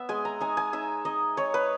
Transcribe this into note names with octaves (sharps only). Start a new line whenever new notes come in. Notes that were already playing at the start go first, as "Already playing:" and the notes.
Already playing: B3 E5
G#3 G#5
A#5
D#4 G#5
G#5
D#4 E5
D#4 D#5
D#4 C#5
B4